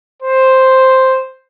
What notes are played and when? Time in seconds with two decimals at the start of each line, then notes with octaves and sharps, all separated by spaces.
0.22 C5